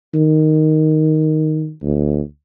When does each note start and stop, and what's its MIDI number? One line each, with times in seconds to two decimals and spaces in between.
0.15 1.71 51
1.83 2.21 38